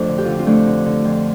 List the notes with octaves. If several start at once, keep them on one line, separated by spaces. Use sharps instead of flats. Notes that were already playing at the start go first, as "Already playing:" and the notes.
Already playing: F2 A3 D4 A4 C5
D3
G4
D3 F4
D4
C4 F4
F2 A3 D4
D3
D3
F2